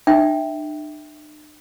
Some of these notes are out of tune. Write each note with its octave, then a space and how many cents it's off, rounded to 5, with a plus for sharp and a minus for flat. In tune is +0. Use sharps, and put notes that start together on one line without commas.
D4 +45 E5 -10 G5 +0